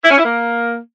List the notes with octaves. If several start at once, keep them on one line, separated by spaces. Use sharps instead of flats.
E4
C#4
E4
A#3